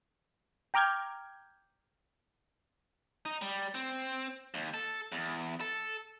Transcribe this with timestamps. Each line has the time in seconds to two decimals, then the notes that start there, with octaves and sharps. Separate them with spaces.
0.74 G5 A#5 D6 F6 G6 G#6
3.25 D#4
3.42 G3
3.75 C4
4.54 D#2
4.74 A4
5.12 E2
5.61 A4